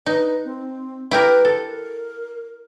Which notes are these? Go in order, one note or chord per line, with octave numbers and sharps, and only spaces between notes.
D#4 B4
C4
E4 G4 A#4 B4
A4
A#4